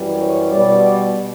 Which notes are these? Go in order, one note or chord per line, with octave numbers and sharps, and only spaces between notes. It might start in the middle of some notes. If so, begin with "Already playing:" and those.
Already playing: F#2 E3 G3
C#5
B2 G3 D5